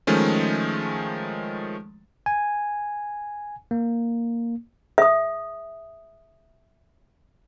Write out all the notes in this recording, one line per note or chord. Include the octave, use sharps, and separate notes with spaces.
D#3 F3 G#3 A3 C#4
G#5
A#3
E5 D#6